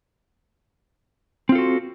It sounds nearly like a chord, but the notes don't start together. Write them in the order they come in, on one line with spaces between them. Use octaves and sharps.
C4 F4 A4 F#4